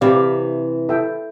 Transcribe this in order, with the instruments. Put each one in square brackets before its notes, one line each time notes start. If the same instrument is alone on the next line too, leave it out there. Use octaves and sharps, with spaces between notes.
[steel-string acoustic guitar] C3 E3 [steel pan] C4 G4 D5 F5
[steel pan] E4 A4 E5 G5